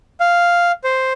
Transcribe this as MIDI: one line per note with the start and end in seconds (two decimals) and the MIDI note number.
0.20 0.72 77
0.84 1.13 72